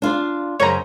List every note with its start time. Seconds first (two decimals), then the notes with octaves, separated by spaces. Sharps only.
0.02 D4 F4
0.60 F#2 C#3 C5 C#5 A#5